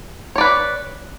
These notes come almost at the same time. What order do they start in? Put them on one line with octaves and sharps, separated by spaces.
C#5 D5 B4